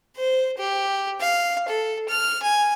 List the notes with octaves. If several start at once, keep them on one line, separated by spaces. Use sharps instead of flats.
C5
G4
F5
A4
F6
G#5